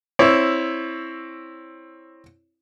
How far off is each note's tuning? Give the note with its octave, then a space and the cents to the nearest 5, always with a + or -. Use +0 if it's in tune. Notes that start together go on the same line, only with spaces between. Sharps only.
C4 +20 E4 +0 C#5 +20